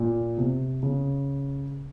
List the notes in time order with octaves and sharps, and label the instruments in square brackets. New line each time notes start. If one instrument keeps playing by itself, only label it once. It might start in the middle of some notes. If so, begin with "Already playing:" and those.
Already playing: [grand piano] A#2
C3
C#3